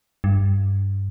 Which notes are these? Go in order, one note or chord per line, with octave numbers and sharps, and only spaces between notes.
G2